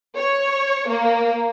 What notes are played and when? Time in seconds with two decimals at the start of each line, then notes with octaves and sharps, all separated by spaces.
0.17 C#5
0.88 A#3